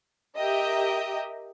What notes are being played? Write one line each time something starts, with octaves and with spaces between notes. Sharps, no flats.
G4 A#4 D#5 E5 G5